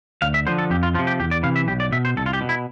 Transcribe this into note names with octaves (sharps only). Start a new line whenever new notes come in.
D2 F5
E5
D3 F3 C5
A4
F2 G4
F4
C3 F3 F4
G4
E2 G4
D5
C3 E3 F5
E5
B1 G4
D5
B2 E5
C5
C2 A4
F4
G4
B2
E4